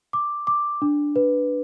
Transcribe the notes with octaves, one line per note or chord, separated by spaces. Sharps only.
D6
D6
D4
B4